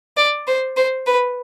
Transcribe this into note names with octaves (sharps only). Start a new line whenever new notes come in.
D5
C5
C5
B4